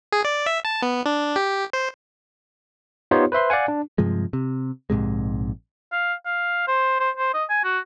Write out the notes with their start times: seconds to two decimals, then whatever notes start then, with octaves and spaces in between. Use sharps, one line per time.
0.12 G#4
0.25 D5
0.46 E5
0.65 A5
0.82 B3
1.06 D4
1.36 G4
1.73 C5
3.11 B3 D#4 F4 G4 C5 C#5
3.32 B4 C5 E5 C6
3.50 D5 F5 F#5 G#5
3.68 D4
3.98 G2 C3 F3 G#3
4.33 C3
4.90 A#1 G#2 C3 G#3
5.92 F5
6.26 F5
6.68 C5
7.00 C5
7.17 C5
7.34 D#5
7.50 G#5
7.64 F#4